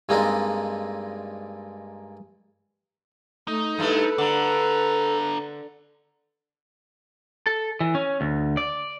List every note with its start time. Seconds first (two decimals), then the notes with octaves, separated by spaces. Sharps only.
0.09 G2 G#3 A#3 C4 D4 D#4
3.48 A3 D#4
3.79 G2 A3 E4 A4 B4
4.18 D3 D4 A#5
7.46 A4
7.80 E3
7.95 C#4
8.21 D2
8.57 D5